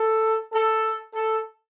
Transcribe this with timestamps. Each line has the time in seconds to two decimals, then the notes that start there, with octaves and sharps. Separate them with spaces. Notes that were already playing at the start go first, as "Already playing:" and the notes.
Already playing: A4
0.52 A4
1.14 A4